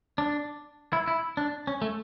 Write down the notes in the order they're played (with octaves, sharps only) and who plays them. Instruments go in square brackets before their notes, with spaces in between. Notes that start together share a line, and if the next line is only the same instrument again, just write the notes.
[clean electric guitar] D4
E4
E4
D4
C#4
A3